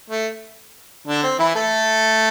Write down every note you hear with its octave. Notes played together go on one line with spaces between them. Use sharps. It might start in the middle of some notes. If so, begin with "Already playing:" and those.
A3
D3 D4
C4
E3 E4
A3 A4